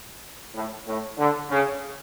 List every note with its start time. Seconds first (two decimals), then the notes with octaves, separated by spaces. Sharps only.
0.54 A2
0.86 A2
1.18 D3
1.49 C#3